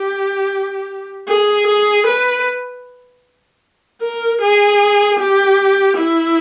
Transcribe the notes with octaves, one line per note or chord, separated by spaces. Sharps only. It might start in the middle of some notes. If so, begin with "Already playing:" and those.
Already playing: G4
G#4
G#4
B4
A#4
G#4
G4
E4